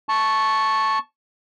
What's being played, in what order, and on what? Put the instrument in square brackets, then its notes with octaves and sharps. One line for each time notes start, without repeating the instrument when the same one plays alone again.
[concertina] A5 C#6